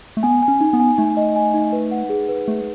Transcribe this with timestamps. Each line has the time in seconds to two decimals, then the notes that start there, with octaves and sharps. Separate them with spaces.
0.17 A3
0.23 B3 G#5
0.43 G#5
0.48 C#4
0.61 D#4
0.73 B3
0.80 G#5
0.98 A3 D#4
1.17 D#5
1.36 G#5
1.54 D#4
1.72 B4
1.91 F#5
2.10 G#4
2.29 B4
2.47 A3 G#4